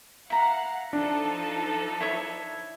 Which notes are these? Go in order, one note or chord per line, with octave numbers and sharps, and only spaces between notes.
E4 F5 F#5 A#5
F3 D4 D#4 A4
E4 C#5 E5